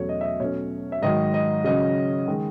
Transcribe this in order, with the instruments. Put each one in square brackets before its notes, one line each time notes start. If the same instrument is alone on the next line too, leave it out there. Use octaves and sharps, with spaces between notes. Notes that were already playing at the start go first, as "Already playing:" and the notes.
Already playing: [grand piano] E2 B2 F#3 A3 C#4 C#5
D#5
E5
D#5
B2 F#3 A3 C#4 C#5
E5
G#2 D#3 F#3 D#5
D#5
C#3 F#3 C#4 D#5
D#3 G#3